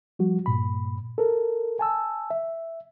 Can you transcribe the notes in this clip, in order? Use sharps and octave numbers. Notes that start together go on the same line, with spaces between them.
F3 G3 F#4
G2 A#2 B5
A4 A#4
G#5 A5 E6
E5